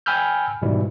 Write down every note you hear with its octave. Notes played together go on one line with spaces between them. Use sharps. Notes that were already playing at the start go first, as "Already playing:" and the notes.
G5 G#5 B5 E6 F6 G6
G#2 B2 E3 G3 E4